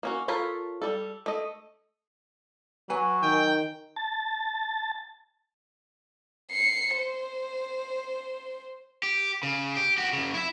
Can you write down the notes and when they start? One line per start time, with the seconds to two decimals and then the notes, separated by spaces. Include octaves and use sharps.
0.03 A#3 C#4 F#4
0.28 F4 A4 A#4 C#5 B5
0.82 G3 A4
1.26 A3 D#5
2.90 F#3 B4 G#5
3.23 D#3 G5 G#5
3.96 A5 A6
6.51 C7 C#7
6.98 C5
9.03 G4
9.43 C#3
9.76 G4
9.98 F#4 G4
10.13 F#2 C#3
10.34 E4 E5